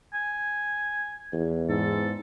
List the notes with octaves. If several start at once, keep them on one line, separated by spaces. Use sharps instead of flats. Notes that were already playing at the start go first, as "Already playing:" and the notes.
G#5
E2
G#2 A4